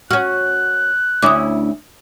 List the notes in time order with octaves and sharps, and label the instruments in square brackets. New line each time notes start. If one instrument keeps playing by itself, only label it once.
[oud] C#4 F#4 [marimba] F6 [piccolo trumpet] F#6
[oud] D2 C#4 E4 [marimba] D6 D#6